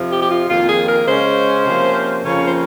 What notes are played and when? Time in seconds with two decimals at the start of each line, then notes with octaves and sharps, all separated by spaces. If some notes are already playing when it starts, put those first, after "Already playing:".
Already playing: F2 C3 F3
0.09 G4
0.21 G4
0.29 F4
0.49 F2 D#3 A#3 F4
0.68 G#4
0.88 A#4
1.06 C#3 G#3 C#4 C5
1.65 C3 F3 A#3 C#4
2.23 F2 C#3 F3 A#3 C#4 C#5
2.47 C5